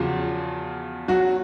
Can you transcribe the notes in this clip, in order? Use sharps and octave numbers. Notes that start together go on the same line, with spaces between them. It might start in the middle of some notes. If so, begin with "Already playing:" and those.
Already playing: E2 C#3 F3 F#3 F4
F#3 F#4